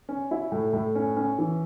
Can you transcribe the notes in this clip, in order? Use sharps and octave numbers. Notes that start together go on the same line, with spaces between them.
C#4
E4
A2
A2
C#4
C#4
E3